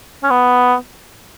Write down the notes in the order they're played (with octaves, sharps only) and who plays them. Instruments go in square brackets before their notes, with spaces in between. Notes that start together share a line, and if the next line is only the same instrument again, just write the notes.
[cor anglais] C#4
B3